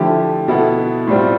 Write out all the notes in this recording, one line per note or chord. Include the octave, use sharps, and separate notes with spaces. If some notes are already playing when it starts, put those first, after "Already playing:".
Already playing: D3 F3 A3 E4 G4
B2 B3 E4 A4
A2 G3 C4 F4